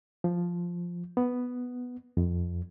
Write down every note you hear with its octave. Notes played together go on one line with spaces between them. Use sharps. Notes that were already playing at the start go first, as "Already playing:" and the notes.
F3
B3
F2